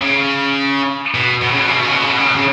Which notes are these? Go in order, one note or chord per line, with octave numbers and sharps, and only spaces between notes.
C#3
B2
B2
C#3
B2
C#3
B2
C#3
B2
C#3
B2
C#3
B2
C#3